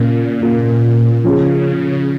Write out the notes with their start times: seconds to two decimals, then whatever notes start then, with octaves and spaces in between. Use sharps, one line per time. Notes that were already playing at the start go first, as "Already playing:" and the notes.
Already playing: A#2 C#3 A#3 F4
0.41 C#3 A#3 F4
1.24 C#3 F3 C#4 G#4